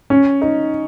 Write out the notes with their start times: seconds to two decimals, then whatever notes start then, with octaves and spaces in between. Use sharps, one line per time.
0.10 C#4
0.42 D#4